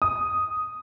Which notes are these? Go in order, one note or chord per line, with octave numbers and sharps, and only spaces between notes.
D#6